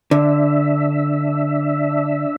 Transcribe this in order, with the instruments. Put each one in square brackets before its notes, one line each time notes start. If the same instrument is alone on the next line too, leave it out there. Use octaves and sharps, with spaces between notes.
[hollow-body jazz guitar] D3 [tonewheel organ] D4 E5